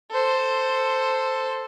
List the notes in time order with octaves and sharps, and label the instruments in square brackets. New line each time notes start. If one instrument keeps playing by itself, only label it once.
[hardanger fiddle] A4 C5